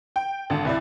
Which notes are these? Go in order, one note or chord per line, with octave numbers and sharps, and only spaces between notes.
G5
G#1 D3 A5
C2 E4 D5